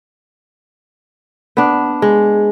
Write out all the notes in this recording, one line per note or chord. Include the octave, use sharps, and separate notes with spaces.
B3 D4
G#3